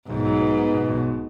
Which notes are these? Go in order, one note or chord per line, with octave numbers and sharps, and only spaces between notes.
B1 G#2
F#3
B3
B3
B2
B1